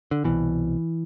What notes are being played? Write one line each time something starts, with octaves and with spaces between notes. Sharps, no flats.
D3
C2 B2 E3